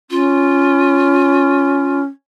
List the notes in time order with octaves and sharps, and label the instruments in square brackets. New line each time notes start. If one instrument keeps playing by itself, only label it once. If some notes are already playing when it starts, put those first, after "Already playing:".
[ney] C#4 [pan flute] F4